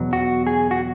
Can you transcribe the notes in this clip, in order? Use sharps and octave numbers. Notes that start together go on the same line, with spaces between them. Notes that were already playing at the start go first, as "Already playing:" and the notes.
Already playing: E2 B2 F#3
F#4
G#4
F#4